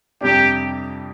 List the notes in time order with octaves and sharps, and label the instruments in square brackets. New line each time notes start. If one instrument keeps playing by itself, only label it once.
[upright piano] F2 C3 G3 D4 [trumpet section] G4